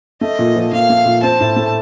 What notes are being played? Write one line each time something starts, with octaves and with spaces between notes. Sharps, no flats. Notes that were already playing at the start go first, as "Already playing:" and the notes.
A3 D#5
A#2
F3
A#2 F5
A3
A#2
C4 A5
A2
A3